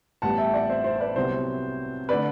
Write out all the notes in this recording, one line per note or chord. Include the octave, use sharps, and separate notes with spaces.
A1 A2 G3 B3 F#5 A5
E5 G5
D5 F#5
C5 E5
C5
C5
B4 D5
C2 C3 F#3 B3 C5
D3 A3 B4 D5